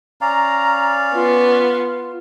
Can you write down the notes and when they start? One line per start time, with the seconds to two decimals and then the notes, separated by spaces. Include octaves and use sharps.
0.21 C#4 D5 F5 A#5
1.14 B3 F4